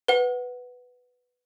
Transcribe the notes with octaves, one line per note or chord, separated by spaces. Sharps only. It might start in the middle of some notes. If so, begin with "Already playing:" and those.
B4 F#5